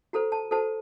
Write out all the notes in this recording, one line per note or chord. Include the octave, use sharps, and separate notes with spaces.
F#4 A4 C5 A#5
A5
F#4 A4 C5 A5